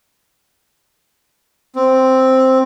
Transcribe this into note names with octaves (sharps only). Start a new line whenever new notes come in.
C4